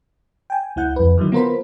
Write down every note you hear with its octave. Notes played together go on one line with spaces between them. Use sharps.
G5 G#5
C#2 E4 F#5 G6
F2 B4
D3 D#3 F#3 E4
B3 F4 A#4 C5 B5